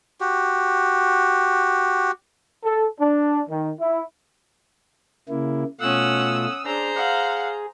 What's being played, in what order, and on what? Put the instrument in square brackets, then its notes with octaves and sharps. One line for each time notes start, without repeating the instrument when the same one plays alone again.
[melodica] F#4 G4
[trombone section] A4
D4
D#3
E4
[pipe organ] C#3 A#3 E4
[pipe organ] B2 A3 F4 [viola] C#4 F#5 [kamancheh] D#6 E6
[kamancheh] D4 [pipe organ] G#4 [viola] C5 A#5
[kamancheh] F5 F#5